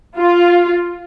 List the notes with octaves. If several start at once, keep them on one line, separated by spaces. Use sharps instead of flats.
F4